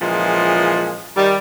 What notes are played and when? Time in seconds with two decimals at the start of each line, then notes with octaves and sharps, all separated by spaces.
0.01 A#2 C#3 E3 F3 G#3
1.16 D#3 G3